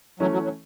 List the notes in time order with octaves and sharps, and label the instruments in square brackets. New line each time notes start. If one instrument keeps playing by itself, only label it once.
[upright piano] E3 A3 C#4 [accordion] F#3
[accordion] F#3
F#3